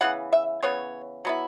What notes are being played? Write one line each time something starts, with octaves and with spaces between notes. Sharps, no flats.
C#3 E3 B3 F#5
E5
C#3 E3 B3 C#5
F#3 B3 E4